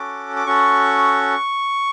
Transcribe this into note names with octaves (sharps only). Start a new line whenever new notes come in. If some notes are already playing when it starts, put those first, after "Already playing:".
Already playing: C#4 F#4 A4 D6
D6
C#4 F#4 A4 C#6